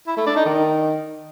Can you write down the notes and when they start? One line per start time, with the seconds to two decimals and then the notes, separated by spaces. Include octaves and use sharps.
0.07 E4
0.17 A3
0.26 D4
0.36 D#4
0.45 D#3